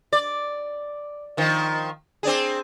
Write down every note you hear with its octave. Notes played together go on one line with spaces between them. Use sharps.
D5
D#3 F3
C4 D4 G#4